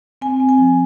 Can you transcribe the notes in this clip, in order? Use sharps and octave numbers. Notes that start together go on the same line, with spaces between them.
C4 G#5
C4
G#5
F3